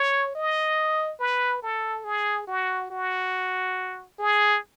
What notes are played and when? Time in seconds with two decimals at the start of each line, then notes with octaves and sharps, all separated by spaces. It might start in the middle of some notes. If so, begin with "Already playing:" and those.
Already playing: C#5
0.35 D#5
1.20 B4
1.63 A4
2.04 G#4
2.47 F#4
2.91 F#4
4.19 G#4